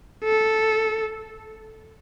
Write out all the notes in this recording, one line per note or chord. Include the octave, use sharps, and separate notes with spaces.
A4